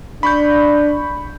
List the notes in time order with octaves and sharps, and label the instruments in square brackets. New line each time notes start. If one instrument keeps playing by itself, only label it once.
[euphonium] D4 [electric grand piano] B5 C#6 G6